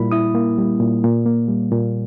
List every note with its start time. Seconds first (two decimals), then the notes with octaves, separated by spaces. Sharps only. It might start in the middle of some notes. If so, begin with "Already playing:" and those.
Already playing: A#2 G3 A#3 E4 B5
0.12 E4 D#6
0.35 A#3
0.58 G3
0.80 A#2
1.03 A#2
1.26 A#3
1.48 G3
1.72 A#2